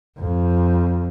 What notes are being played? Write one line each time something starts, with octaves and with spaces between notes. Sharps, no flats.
F2